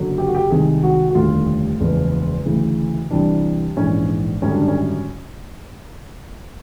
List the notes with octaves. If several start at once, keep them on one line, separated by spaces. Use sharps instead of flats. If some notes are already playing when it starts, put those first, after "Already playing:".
Already playing: F#1 F#2 D3 F#3
G4
F#4
G4
C2 C3 D#3 G#3 G#4
F#4
F#4
F1 D#2 D3 G3 F4
F#1 E2 C#3 F3 G#3
D2 C#3 E3
C2 C3 E3 G3 D4
A#1 G#2 E3 C#4
G#1 F#2 D3 G3 C#4
D4
C#4